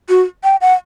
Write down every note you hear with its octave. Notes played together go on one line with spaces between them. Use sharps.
F#4
G5
F#5